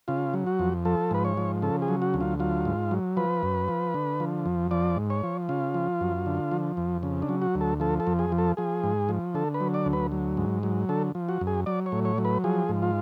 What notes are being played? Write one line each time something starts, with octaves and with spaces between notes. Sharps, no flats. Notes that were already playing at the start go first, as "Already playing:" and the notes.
C#3 F4
F#3
F#4
F2
F3 A4
G#2 B4
C#5
F3
C#3 A4
G#4
F#3
F#4
D2
F4
F#3 F4
G#2
F#3
F3 B4
F#2
F3
D3
F3
F2
F3 D5
G#2
C#5
F3
C#3 F4
F3
F#2
D3
F3
F2
C#3
D4
F#3
F#4
D2
A4
F3 A4
A4
F2
G#4
F3
A4
F3 G#4
G#2
F3
D3 A4
B4
F#3
D5
D2
B4
F#3
G#2
F#3
D3 A4
F3
F#4
F#2
G#4
F#3 D5
C#5
A2
C#5
F#3
B4
F3 G#4
G#2
F4